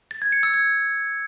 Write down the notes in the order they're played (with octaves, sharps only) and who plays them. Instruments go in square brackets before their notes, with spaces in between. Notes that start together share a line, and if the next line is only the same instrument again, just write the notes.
[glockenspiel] A6
G#6
C#7
E6
G#6